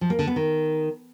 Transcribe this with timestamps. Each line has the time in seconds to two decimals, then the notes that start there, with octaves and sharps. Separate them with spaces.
0.01 F3
0.10 A#3
0.19 D3
0.27 B3
0.36 D#3